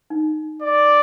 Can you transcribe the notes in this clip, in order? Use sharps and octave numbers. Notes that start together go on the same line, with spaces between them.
D#4
D5